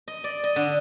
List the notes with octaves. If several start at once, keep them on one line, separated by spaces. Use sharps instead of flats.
D#5
D5
D#5
D3